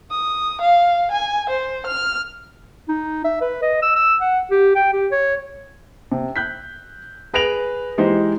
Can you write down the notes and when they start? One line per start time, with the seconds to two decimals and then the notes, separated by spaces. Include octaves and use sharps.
0.11 D#6
0.61 F5
1.11 G#5
1.49 C5
1.86 F6
2.89 D#4
3.25 E5
3.41 B4
3.62 D#5
3.83 E6
3.96 E6
4.21 F#5
4.51 G4
4.75 G5
4.93 G4
5.12 C#5
6.12 C3
6.36 F#6 G6 B6
7.34 G#4 B4 A#6 D7 F7 F#7
7.98 E3 G#3 D#4 G4 C5